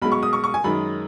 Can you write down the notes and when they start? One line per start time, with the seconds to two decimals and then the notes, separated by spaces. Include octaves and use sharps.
0.02 B1 B2 G#3 B5
0.12 C#6
0.23 D#6
0.33 C#6
0.44 C#6
0.54 G#5
0.64 F#2 D#3 G#3 B5